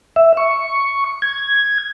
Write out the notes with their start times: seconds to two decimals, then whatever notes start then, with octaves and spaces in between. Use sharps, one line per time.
0.16 E5
0.37 C#6
1.22 G#6